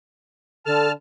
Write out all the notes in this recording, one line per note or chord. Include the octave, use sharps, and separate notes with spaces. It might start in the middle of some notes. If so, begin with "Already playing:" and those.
D3 A4 A5 F6